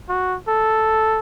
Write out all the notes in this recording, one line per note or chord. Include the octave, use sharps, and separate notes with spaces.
F#4
A4